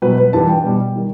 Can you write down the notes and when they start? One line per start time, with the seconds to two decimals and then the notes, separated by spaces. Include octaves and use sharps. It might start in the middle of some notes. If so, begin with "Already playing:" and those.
0.02 B2 F#3 B4
0.18 B4
0.33 G2 E3 G3 A5
0.49 G5
0.64 B2 G3
0.95 D#3 G3